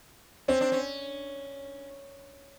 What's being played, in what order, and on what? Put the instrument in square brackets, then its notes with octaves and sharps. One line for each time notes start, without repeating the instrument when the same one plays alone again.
[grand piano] C4 [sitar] C#4
[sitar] D4
C#4